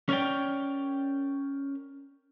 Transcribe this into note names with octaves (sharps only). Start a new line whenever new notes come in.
C#4 A#4 C#5 D5 G5